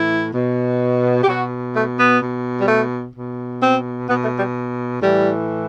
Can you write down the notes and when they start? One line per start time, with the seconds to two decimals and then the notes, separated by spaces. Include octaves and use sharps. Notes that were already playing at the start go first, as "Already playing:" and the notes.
Already playing: A2 E3 E4
0.34 B2
1.23 G4
1.28 B2 F#4
1.75 A3
1.98 B3
2.22 B2
2.58 G3
2.68 A3
3.15 B2
3.62 C4
4.09 B2 B3
4.24 A3
4.39 G3
5.02 A2 E3 G3